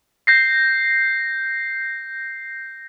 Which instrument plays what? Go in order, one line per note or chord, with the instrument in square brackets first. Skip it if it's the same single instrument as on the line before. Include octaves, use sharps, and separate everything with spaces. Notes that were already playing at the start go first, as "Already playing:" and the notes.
[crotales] G6 A#6 C7